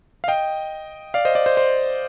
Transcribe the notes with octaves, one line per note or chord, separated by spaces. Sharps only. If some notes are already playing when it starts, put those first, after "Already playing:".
F5
D#5 G5
D5 F5
C5 D#5
D5
C5
C5